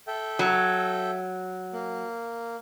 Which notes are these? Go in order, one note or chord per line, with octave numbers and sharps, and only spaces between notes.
A4 E5 G5
F#3
A#3